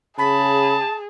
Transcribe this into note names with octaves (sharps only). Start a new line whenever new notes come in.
C#3 G#4 A5 B5